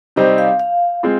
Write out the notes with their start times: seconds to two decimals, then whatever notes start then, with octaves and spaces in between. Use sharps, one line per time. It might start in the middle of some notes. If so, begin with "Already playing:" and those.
0.16 C3 G3 C4 D#4 C5
0.38 F5
0.60 F5
1.03 G#3 C4 F4